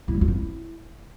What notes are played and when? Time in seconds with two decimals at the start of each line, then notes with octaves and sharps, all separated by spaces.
0.08 E4
0.15 G3
0.21 F4
0.28 D#4
0.35 E4